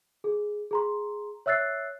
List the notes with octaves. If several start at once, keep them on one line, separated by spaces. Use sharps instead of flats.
G#4
G#4 A#5 C6
C#5 E5 E6 F#6 A6 C7